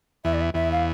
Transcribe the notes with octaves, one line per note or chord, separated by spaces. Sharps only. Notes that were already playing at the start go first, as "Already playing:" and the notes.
E2 E5
D5
E5
E2 E5
F5